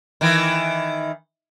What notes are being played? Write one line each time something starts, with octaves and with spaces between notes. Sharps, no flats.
D#3 E3